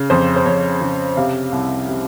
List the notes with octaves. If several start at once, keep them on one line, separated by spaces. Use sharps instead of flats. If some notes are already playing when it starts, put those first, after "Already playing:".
Already playing: C#3
F2 C5
C5
F2 C#5
C#3
C3 F5
C2
C3